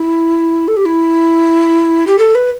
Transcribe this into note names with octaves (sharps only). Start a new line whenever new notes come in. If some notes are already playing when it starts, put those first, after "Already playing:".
Already playing: E4
A4
G4
E4
G4
A4
B4